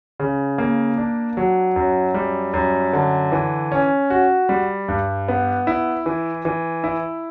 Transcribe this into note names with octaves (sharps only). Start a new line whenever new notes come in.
C#3
A#3
D4
F#3
F#2
G3
F#2
D3
E3
C#4
F#4
G3
G2
B3
E4
E3
E3
E4